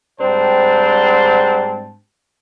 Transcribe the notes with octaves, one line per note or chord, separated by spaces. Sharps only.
G#2 G3 C4 D4 C5 A5